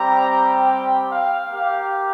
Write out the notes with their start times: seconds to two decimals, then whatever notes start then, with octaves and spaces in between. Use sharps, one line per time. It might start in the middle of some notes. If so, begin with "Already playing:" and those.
Already playing: G3 C4 G4 A#5
0.67 G5
1.08 F5
1.50 A#3 G4 F5